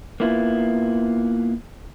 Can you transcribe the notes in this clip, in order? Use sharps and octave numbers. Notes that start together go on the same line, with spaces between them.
A#3 B3 E4 F4